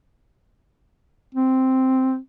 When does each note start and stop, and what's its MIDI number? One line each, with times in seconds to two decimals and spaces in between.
1.35 2.17 60